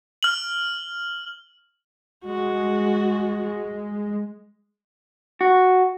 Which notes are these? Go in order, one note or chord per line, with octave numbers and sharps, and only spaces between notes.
F6 F#7
G#3 F#4
F#4